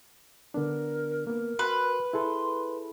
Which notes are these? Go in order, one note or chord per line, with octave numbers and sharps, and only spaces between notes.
D3 B3 D4 A#4
A#3 B3 A#4
F#4 B4 C6
E4 G#4 A4 C6